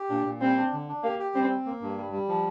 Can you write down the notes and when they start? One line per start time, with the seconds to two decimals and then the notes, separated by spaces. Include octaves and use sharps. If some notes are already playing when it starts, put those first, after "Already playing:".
Already playing: G4
0.10 A#2 D4
0.26 A#2
0.41 G3 C4
0.57 D4
0.72 D3
0.88 D4
1.03 A#3 G4
1.19 G4
1.35 G3 C4
1.50 C4
1.66 A#3
1.82 G2
1.97 G3
2.12 G3
2.28 F3